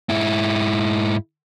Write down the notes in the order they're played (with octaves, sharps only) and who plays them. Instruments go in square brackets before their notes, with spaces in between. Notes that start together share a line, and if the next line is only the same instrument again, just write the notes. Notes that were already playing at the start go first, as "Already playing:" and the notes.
[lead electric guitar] G#2 E4